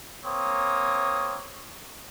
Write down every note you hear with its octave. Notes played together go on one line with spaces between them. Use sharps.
A#3 C4 C#5 D#6